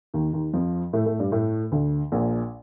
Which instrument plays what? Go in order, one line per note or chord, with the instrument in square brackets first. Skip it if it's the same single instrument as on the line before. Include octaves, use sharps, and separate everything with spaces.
[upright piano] D#2 D#3
D#2 D#3
F2 F3
A2 A3
A2 A3
G2 G3
A2 A3
D2 D3
A#1 A#2